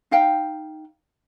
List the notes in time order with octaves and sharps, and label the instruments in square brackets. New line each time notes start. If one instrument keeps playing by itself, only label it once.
[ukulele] D#4 F5 G5